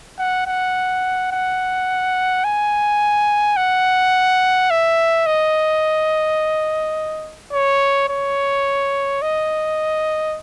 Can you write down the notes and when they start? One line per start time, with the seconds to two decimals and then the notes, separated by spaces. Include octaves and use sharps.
0.19 F#5
0.46 F#5
1.32 F#5
2.44 G#5
3.57 F#5
4.71 E5
5.26 D#5
7.53 C#5
8.09 C#5
9.22 D#5